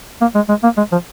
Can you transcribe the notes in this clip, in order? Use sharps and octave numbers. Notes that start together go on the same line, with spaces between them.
A#3
G#3
G#3
A#3
G#3
F3